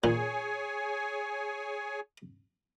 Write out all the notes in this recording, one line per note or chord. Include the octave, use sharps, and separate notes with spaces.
A#2 G#4 C#5 G#5